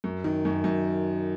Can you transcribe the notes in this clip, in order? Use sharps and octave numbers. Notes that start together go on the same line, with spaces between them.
F#2
D#3
F#2
F#2